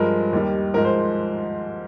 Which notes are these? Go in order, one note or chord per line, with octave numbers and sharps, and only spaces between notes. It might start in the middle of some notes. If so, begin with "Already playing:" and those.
Already playing: G2 F3 G#3 A#4
D#2 D#3 G3
G#2 F3 G#3 A#4
C5